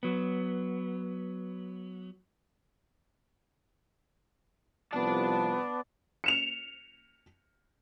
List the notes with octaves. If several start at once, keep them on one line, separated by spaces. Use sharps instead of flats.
F#3 B3
C2 F3 B3 D5 A5
C#7 E7 F7